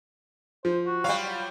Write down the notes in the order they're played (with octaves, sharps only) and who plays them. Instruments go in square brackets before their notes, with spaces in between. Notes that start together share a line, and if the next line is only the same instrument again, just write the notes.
[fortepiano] F3 [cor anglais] C5
[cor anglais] F#4
[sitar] F#3 G3 [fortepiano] F5
[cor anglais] F4